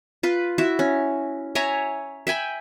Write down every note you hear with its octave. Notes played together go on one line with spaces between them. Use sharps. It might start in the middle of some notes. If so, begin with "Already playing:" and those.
F4 B4
E4 F#4 E5
C#4
C#5 E5 G#5 A#5
E5 G5 G#5 B5